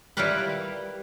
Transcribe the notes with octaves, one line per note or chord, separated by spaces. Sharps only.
G3 E4 F4 G4 A#4 B4